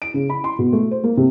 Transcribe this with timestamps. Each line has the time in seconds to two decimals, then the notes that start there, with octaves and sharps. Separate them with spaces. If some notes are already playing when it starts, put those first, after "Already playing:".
0.02 D7
0.14 C#3
0.30 B5
0.44 C6
0.59 B2
0.73 A3
0.91 C5
1.04 A#3
1.17 C3